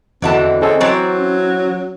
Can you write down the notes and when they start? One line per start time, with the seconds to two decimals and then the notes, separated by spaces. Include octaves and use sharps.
0.22 E2 D3 E3 C4 F#4 A4 D#5 A5
0.62 C4 C#4 G#4 A4 D#5
0.80 E3 F#3 C4 C5 A#5 C#6 A6
1.18 C#4